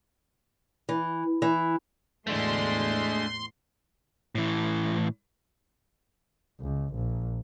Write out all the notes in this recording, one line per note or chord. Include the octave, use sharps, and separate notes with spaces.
E3
E3
E2 A2 G#3 A3 D4 C6
A2 E3
C#2
A#1